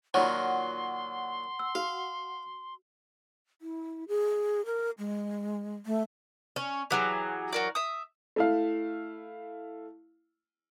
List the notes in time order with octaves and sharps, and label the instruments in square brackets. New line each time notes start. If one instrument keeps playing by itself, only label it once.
[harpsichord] A#2 D#3 F#3 [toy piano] F4 F#4 C#5 [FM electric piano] F#5 [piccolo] C6
[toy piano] E6
[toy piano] F#4 [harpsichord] F5
[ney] E4
G#4
A#4
G#3
A3
[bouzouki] C#4
[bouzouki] E3 F#3 [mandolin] G4 G#4
[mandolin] F#4 A#4 D5
E5 D#6
[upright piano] A3 E4 F5